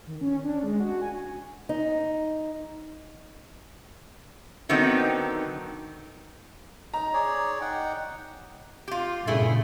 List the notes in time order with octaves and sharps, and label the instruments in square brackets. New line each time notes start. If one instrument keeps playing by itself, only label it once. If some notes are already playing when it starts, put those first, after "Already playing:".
[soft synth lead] D#3
C#4
D4
G#3
F#4
G#5
[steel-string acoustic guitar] D#4
[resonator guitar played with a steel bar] D3 D#3 F#3 B3 C4 D#4
[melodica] D#4 [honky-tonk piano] A#5
[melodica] G#4 C#5 D5
D#4 F#5 G5
[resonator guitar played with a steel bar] F4 G4
[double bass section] G2 A#2 C#3 [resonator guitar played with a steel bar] A3 E4 G#4